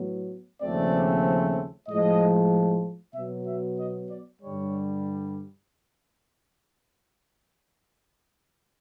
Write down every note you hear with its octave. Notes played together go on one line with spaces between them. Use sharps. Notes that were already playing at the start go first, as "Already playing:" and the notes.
Already playing: A2 F#3 B3
D#2 C#3 F3 A3 C4 D5
A2 F3 G#3 D#5
B2 F#3 B3 E5
E5
D#5
D5
G2 D3 G3 C#5